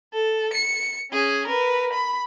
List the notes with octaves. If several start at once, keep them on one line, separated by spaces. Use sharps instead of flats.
A4
C#7
C#4 G#4
A#4 B4
B5